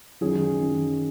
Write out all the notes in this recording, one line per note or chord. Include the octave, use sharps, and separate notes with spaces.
F#2 D#3 F#3 G#4
F#2 D#3 F#3